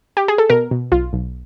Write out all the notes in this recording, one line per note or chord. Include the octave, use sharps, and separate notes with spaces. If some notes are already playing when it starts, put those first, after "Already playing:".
G4
G#4
A4
B2 A#4
B2
B1 F4
B1